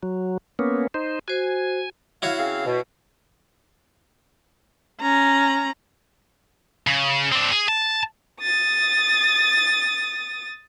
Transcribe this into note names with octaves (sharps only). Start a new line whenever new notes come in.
F#3
A#3 B3 C#4
D#4 C5
F#4 C5 G#5
E4 F#4 C#5 F5
C#3 C4 F5
B2
C#4 A#5
C#3
C4 D4
G#4
A5
D#6 A6